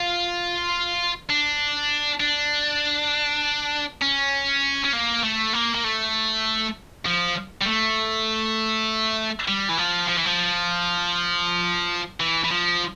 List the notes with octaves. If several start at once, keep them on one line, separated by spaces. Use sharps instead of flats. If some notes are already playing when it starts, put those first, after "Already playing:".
Already playing: F4
D4
D4
C#4
C#4
A#3
A3
A#3
A#3
A3
F3
G3
A3
G3
E3
F3
F3
E3
F3
E3
E3
F3